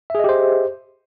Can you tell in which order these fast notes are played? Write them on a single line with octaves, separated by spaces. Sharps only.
E5 G#4 D#5 G4 C5